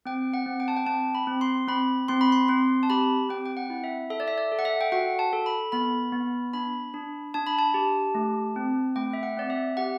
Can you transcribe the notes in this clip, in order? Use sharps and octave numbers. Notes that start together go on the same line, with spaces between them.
C4 G5
F#5
C4
G5
A5
G5
C4 A5
B5
C4
C6
C4 B5
C4 C6
B5
C6
C4 C6
A5
G4 B5
C4 G5
G5
F#5
E4
E5
A4 E5
D5
E5
D5
A4
F#5
E5
G5
F#4 F#5
A5
A4
B5
B3 B5
B3
D4 B5
D4
D4 A5
B5
A5
G4
A3
C4
A3 G5
E5
F#5
C4 D5
E5
G4 F#5